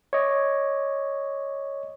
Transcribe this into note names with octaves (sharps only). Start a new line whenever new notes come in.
C#5 D#5